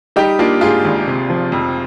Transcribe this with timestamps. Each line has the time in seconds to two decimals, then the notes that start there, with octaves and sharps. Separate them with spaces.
0.16 G3 D#4 G4
0.39 A#3 D4 F4
0.61 G#2 F4 G#4
0.85 G#1
1.07 C3
1.30 F3
1.52 F2